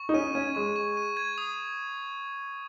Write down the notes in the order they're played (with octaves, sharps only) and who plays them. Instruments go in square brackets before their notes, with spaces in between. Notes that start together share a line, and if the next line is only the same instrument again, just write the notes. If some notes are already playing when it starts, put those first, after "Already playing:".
Already playing: [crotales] C#6
[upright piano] D#4
[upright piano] C#4 [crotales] D#7
[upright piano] C#4 [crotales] G#6
[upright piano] G#3 [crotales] C#6
[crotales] C#6
D#7
G#6
D#6